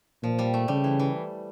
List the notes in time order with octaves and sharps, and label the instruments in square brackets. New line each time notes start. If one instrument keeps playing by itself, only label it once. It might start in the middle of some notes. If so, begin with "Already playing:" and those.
[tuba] A#2 [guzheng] F3
[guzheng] G3
A3
[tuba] C#3 [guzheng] G3
[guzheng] E3
E3